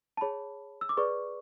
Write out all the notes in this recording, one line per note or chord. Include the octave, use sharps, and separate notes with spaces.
A5
G#4 C#5 B5
E6
D6
G#4 B4 D5 C#6